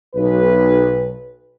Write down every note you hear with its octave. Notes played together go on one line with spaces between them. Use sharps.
B1 B4